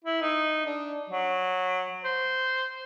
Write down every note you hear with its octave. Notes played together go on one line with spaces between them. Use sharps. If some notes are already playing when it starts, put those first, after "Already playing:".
E4
D#4
D4
F#3
C5